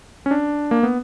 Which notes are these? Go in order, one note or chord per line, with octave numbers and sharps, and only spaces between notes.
C#4
D4
A#3
B3